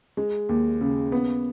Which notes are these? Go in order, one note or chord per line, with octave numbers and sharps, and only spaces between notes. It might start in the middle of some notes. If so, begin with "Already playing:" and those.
G#3
D#2
C#3
B3